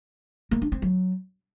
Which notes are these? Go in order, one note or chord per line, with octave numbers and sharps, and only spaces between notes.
A#3
D4
C4
F#3